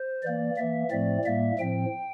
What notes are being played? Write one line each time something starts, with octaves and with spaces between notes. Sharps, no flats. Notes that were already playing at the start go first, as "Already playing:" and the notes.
Already playing: C5
E3 A#3 D5
E3 A#3 E5
A2 F3 A3 C4 D5
A2 G3 A#3 E5
A2 F3 C4 G5